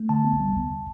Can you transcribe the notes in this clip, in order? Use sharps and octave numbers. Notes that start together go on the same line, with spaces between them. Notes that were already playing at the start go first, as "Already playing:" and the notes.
Already playing: A3
D3 A5
B3
G3